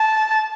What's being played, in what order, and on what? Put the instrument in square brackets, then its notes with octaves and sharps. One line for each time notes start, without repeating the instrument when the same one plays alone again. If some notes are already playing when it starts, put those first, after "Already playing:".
Already playing: [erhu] A5